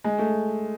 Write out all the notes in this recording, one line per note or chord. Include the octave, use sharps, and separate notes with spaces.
G#3
A3